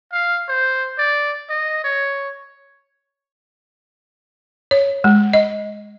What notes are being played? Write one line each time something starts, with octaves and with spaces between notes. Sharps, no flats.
F5
C5
D5
D#5
C#5
C#5
G#3
D#5